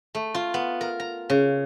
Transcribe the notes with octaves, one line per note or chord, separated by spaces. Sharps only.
A3
F4
B3
A#4
A#5
C#3